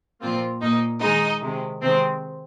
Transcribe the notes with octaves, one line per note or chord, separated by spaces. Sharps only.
A#2 F3 A#3 C4 F4
A#2 A#3 D#4
D#3 G#3 D#4
C3 D#3 G#3
C3 D#3 G#3 C4